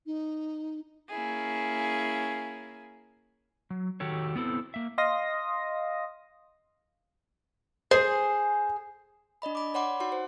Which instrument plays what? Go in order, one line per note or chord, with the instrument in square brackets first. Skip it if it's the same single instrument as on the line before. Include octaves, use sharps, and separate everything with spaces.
[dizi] D#4
[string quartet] A#3 C#4 E4 G#4
[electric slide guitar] F#3
D#3 F#4 G4 A4 C#5
B3 C4 E4 A4
A#3 E5
[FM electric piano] D#5 F5 C6 D#6 A#6
[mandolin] G#4 [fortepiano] C5
[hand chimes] D4 D5 D#5 B5
B5 D6
C#5 D5 F#5 B5 C6 D6
D#4 F#4 F#5 C6
C5